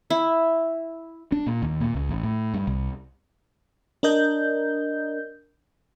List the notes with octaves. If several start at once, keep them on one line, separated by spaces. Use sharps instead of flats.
E4
D4
A#2
D#2
A#2
C#2
A1
A2
G2
C2
D4 A#4 D#5 G6